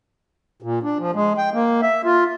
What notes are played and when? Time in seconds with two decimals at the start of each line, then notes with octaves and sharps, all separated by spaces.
0.62 A#2
0.83 D4
0.99 F3
1.14 G#3
1.38 G5
1.54 A#3
1.82 E5
2.05 F4